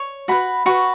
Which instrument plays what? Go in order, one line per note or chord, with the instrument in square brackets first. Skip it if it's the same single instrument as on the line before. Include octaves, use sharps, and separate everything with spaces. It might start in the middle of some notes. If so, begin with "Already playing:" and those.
Already playing: [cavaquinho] C#5
F#4 B4 B5
F#4 B4 C#6